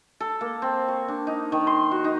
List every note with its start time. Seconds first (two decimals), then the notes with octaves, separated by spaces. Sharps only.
0.20 A4
0.41 A#3
0.62 C4
0.88 C#6
1.08 D4
1.27 D#4
1.52 D#3
1.67 C6
1.91 F#4
2.04 D#4